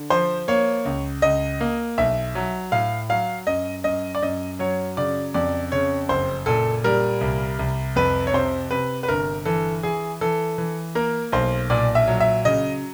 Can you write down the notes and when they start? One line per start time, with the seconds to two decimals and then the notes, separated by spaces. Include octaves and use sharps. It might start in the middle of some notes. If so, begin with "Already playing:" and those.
Already playing: D3
0.10 F3 C5
0.48 A#3 C#5
0.85 C#2
1.22 C#2 D#5
1.61 A#3
1.98 B1 E5
2.35 F#3
2.72 A2 F5
3.09 F#3 F5
3.47 F#2 D#5
3.84 F#2 D#5
4.15 D5
4.22 F#2 D#5
4.59 F#3 C#5
4.97 C#3 D5
5.34 F2 D5
5.72 C#3 C#5
6.09 F#1 C5
6.46 A#2 A4
6.84 G3 A#4
7.21 C2
7.59 C2
7.96 F2 B4
8.27 C#5
8.33 C3 C5
8.71 C3 B4
9.03 B4
9.08 G1 A#4
9.45 E3 A4
9.83 E3 G#4
10.21 E3 A4
10.58 E3
10.95 A#3 A#4
11.32 B1 C5
11.70 A#2 D5
11.95 E5
12.08 F#3
12.20 E5
12.45 C#3 D#5